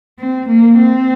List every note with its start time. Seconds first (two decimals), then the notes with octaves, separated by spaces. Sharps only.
0.19 C4
0.48 A#3
0.78 C4